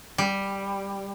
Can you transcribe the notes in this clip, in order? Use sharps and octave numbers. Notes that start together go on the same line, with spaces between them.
G3